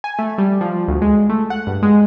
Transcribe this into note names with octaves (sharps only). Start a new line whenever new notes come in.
G#5
A3
G3
F3
D2
G#3
A3
F#5
G2
G#3